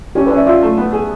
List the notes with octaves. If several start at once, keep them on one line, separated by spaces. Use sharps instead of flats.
C#4 G4 A4
A4 B4
C#4
D5 E5
F4 D5 E5
A3
B3
G#4